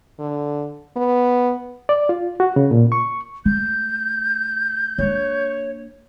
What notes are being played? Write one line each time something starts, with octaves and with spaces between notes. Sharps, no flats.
D3
B3
D5
F4
F#4
C#3
A#2
C#6
A3 G6
A#3 D4 C#5